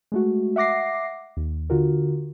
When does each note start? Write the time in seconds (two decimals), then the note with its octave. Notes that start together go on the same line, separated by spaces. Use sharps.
0.12 G#3 A3 F#4
0.56 E5 F#5 D6 A#6 C7
1.37 D#2
1.70 D3 F4 F#4 A#4